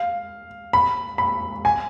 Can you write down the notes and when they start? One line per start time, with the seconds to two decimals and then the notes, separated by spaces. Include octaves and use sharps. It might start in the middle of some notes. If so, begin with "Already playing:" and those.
Already playing: F5
0.73 B5
1.18 B5
1.65 G#5